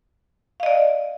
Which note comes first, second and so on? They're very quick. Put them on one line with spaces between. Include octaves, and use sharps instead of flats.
F5 D#5 D5